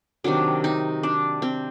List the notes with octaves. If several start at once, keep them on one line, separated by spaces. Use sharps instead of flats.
C3 D#3 F#3 D4
D#4
D4
C4